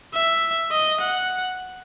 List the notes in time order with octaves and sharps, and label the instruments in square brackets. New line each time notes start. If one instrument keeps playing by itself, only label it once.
[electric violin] E5
D#5
F#5